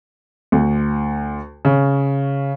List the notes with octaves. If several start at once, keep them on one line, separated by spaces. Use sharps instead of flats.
D2
C#3